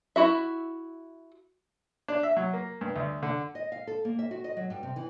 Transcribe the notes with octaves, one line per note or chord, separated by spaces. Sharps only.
E4 F#4 E5
D4
E5
F#3
A#3
G2
D2
D3
D#5
F5
A4
A#3
E5
F#4
D#5
F#3
G2
C3
E3